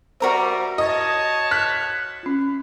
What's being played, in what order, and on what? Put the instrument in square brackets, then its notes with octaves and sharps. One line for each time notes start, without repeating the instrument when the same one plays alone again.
[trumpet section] G3 [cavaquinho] F#4 A#4 E5 [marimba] C5 D5
[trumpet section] C#5 A5 [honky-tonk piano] D#5
[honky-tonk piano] F#6 B6
[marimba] C#4 F4